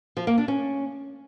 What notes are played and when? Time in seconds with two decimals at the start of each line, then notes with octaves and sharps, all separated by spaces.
0.17 F3
0.27 A#3
0.38 D4
0.48 C#4